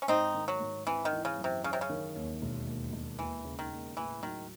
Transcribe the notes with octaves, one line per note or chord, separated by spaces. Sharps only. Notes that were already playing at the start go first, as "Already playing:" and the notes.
C#4
G#2 C4 D#4
D#3
F#3
G#2
E3 C4
D#3
E3
C#3
F#2
C3
C#3 C#4
C3
C#3
D#3
D#2
E1
D#2
E1
D#2 E3
C#3
D#3
D#2
A2 E3
D#3 F#3